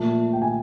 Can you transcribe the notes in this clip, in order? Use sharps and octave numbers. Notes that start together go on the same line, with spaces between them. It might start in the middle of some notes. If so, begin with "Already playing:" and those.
Already playing: A#2 F3 A3 A5
G5
G#5